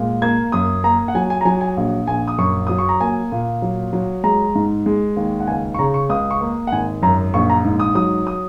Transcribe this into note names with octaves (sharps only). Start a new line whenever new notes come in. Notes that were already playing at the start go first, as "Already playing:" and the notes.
Already playing: A#2 G#3
A#3 G#6
F#2 D#6
A#3 A#5
F#5
F#3 G#5
G#5
A#5
F#3 G#5
G#5
A#1
A#1 G#5
D#6
F#2 C#6
F#3 D#6
C#6
A#5
A#3 G#5
A#2
F#3
F#3
G#3 A#5
G#2
G#3
D#2
F#5
C#2 G#5
C#6
C#3 A#5
C#6
C#2 D#6
C#6
A#3
F#5
G#1 G#5
F#2 A#5
A#1 C#6
A#5
G#2
D#6
F#3 D#6
D#6